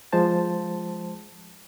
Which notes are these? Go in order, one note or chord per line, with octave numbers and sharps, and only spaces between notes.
F3 G#3 C5 A5